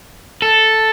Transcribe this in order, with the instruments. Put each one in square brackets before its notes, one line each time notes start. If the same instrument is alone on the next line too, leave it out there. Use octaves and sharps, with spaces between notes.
[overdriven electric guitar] A4